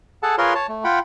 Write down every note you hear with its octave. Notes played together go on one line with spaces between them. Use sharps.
G#4 A4 F#5 A5
F4 G#4 A#4 B4 C#5 C6
C#5 A5
A3
F4 F#5 G5 B5